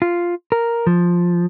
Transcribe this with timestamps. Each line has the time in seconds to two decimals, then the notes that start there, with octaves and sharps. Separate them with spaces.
0.02 F4
0.52 A#4
0.87 F3